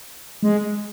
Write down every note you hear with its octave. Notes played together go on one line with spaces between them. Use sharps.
G#3